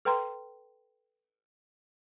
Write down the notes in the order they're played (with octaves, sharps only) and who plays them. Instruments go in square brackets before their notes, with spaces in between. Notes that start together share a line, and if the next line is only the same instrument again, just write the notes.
[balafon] A4 B4 G5 A#5 C6